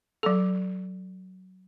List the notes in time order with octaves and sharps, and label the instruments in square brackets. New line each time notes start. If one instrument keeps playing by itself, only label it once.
[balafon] F#3 A4